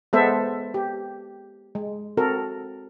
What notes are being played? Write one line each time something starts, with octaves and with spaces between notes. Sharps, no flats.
G#3 B3 A4 C5 E5
G4
G#3
C4 F#4 A4 A#4